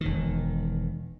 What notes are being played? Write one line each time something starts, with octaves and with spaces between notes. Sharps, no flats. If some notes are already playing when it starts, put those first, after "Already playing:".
E1 D#3